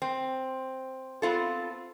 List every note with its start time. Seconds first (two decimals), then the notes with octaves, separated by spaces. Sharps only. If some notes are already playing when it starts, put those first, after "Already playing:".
0.02 C4
1.22 B3 C4 F4 A4